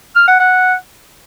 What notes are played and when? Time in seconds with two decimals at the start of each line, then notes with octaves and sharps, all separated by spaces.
0.16 F6
0.28 F#5
0.40 F#5